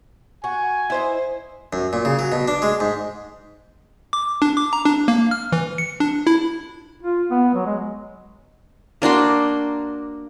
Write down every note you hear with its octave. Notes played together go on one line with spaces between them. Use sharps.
F#4 G#5
E4 C5 D#5
F#2
A#2
C#3
F#3
B2
D4
G#3
G#2
D6
D4
D6
A#5
D4
A#3
F6
E3
C#7
D4
E4
F4
B3
F#3
G#3
A#3 D4 F#4 C6